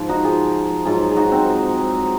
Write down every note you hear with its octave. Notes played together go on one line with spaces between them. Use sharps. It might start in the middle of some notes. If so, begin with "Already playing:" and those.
Already playing: G#2 F3
D#4 F#4
F4 G#4
G#2 F#3 F4 G#4
G#4
D#4 F#4
C4 D#4